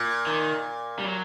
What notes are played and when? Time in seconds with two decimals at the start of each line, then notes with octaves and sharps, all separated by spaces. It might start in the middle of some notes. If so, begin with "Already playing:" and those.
Already playing: A#2
0.27 D#3
0.99 G3
1.05 F#3